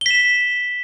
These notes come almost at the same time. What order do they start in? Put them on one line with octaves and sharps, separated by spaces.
G7 B6 E7